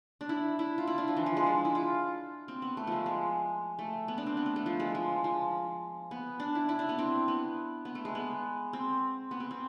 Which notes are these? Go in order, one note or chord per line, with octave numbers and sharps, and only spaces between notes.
D4
E4
E4
F4
E4
D4
F3
E3
F3
G#3
D4
E4
F4
C4
B3
A3
F3 G#3
G#3
A3
B3
D4
C4
B3
A3
A3
F3
G#3
F3
F3
B3
D4
E4
E4
D4
B3
C4
B3
B3
A3
G#3
B3
C4
B3
C4
C4